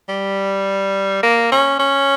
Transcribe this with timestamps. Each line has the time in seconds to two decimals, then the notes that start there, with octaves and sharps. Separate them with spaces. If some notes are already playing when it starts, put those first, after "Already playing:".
0.09 G3
1.23 A#3
1.52 C#4
1.80 C#4